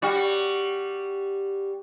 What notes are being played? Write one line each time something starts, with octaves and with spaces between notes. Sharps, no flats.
G3 F#4